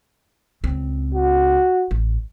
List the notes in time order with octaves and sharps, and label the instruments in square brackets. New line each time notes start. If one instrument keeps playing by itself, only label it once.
[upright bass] C#2 C4
[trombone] F#4
[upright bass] A1